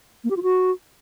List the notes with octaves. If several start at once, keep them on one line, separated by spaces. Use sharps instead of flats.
A#3
G4
F4
F#4